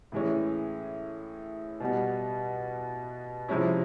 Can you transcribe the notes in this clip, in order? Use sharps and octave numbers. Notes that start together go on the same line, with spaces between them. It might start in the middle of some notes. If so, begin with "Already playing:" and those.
A2 E3 G#3 C#4
B2 G3 B3
C3 F3 G#3 C#4 E4